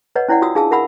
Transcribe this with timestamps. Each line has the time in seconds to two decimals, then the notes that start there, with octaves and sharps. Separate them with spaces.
0.16 B4 C#5 D#5 F#5
0.29 C#4 E4 C#5 D5 F#5
0.42 F4 F#4 D#6 E6
0.55 D4 G#4 F5 A5 E6
0.71 A#4 E5 F#5 B5 E6